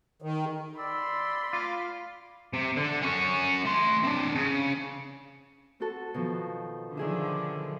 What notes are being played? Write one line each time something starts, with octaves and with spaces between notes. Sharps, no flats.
D#3
D5 B5 C6 E6
F4 F5 D6
C3
D3
C#4 F#4
A3 C6
C4 D4
C#3
C4 F#4 A4
B2 D#3 F3
D3 D#3 F3 G#4 E5